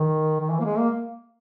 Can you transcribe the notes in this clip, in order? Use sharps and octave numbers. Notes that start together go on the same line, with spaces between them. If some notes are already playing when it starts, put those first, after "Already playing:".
Already playing: D#3
D#3
E3
A#3
G#3
A#3